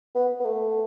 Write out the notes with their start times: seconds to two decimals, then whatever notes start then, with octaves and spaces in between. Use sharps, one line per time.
0.15 B3
0.40 B3
0.45 A3